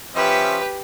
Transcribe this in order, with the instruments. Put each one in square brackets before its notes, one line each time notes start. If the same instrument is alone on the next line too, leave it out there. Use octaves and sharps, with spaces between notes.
[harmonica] F3 C#4 E5 [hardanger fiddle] G4 B4